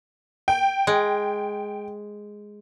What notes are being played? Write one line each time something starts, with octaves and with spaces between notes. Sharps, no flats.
G5
G#3